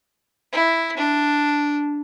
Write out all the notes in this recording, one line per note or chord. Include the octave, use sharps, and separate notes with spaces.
E4
D4